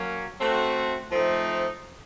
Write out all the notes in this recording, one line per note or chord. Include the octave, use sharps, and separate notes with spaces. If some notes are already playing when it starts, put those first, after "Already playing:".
Already playing: F#3 A#3 C#4
A3 C4 F#4
F3 A3 C4 D#4